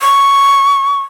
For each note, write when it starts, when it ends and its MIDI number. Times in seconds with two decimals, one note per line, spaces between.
0.02 1.00 85